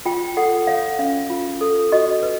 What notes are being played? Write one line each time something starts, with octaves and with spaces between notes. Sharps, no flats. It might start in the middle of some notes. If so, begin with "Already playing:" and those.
F4 G5
A4 F#5
C#5 F5
C#4 F5
F4
A4
F#4 D#5
B4